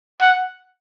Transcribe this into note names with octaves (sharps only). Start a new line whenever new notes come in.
F#5